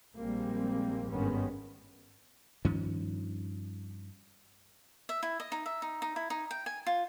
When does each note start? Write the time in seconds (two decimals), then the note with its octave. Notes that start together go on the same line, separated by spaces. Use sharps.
0.17 A#1 G3 G#3 A#3 C4
1.11 G#1 G2 D#3 G#3 B3 C#4
2.65 G2 D#3 F3 C#4
5.09 E5
5.23 E4
5.40 D#5
5.52 D#4
5.66 E5
5.82 D#4
6.02 D#4
6.16 E4
6.30 D#4
6.51 G5
6.66 G#5
6.87 F4